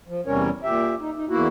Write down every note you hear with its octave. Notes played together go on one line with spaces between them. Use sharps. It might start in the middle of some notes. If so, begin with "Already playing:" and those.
F3
E2 C3 G3 C#4 A#4 C#5
A#2 G4 E5
D#4
D#4
E2 A#3 E4 F#4